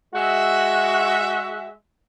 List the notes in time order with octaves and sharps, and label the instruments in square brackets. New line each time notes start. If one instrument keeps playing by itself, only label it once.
[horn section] G#3 F#4 E5